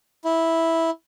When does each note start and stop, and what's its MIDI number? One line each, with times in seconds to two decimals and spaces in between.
0.25 0.90 64